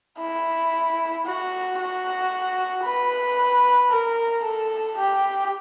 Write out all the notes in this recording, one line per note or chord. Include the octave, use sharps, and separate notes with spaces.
E4
F#4
F#4
B4
A#4
A4
G4